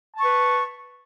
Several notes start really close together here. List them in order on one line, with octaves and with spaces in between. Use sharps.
A5 C#6 B4